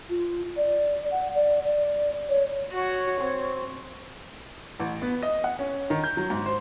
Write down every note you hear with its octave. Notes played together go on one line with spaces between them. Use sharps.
F4
D5
F#5
D5
D5
C#5
F#4 C#5
C4
A1
B3
D#5
F#5
C#4
D#3
G6
F#3
G#2
C5